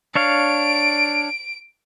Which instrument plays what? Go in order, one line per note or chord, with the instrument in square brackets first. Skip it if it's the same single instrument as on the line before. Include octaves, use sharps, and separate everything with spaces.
[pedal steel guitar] D4 C#5 F5 [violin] D7